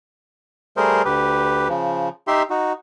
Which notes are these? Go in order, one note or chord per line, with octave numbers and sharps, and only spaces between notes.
G3 A3 G#4 A#4 C5
D2 G4 B4
C#3 F3
D#4 G4 E5 C6
D#4 F#4